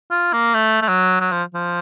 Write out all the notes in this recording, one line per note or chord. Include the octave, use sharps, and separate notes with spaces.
F4
A#3
A3
A3
F#3
F#3
F3
F3